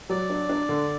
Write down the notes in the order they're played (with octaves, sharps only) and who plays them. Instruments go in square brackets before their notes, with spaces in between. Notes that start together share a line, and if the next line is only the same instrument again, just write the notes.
[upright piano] F#3 [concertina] D5
[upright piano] D4
D4
D3